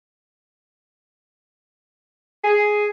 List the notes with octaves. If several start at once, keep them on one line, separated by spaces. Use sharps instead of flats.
G#4